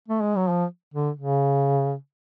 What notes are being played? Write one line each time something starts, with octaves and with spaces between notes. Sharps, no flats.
A3
G#3
F#3
F3
D3
C#3